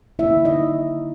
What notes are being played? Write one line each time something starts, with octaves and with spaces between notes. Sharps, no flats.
D3 F#3 A#3 E4 E5
D#4 D#5